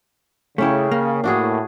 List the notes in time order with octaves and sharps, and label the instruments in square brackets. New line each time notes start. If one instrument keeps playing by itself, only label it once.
[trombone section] C#3 [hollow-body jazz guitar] A3 E4 [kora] C#4 G4 C#5
[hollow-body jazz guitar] A#3
[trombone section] A2 [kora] D4 F#4 G#4